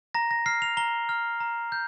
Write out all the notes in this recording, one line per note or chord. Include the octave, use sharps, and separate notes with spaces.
A#5 A#6
A#6
F6 C7
F7
A#5 G7
F6
A#5
G6